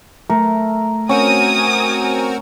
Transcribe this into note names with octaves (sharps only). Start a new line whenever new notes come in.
A3 A#4
C4 C#4 F#4 A#4 G#5 D#6